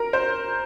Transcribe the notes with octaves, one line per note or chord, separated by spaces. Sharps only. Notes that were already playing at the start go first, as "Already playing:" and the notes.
Already playing: A#4
C5